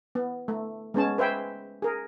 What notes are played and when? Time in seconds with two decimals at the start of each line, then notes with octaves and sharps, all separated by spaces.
0.15 B3
0.48 A3
0.94 G#3 B3 C#4 A5
1.18 B4 C5 E5 G5 G#5
1.82 G#4 A#4